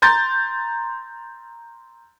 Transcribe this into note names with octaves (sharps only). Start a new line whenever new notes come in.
A#5 C6 G6 A6